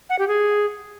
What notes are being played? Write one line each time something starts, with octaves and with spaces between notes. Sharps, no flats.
F#5
G4
G#4